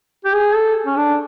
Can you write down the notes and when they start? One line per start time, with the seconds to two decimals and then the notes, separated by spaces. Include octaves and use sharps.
0.25 G4
0.34 G#4
0.55 A4
0.87 C#4
0.97 D4